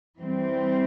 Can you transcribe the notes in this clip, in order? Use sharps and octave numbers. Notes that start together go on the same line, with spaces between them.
E3 G3 C4